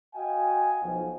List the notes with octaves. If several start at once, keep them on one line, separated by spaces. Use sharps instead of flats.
F#4 D#5 F5 G5 G#5
B1 F3